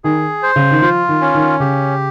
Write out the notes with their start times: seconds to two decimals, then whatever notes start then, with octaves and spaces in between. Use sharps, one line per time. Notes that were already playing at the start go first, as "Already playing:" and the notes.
0.04 D#3 G#4
0.43 C5
0.56 C#3
0.71 D#3
0.82 F3 F4
1.09 D#3
1.21 C#4
1.35 D#3
1.60 C#3 G4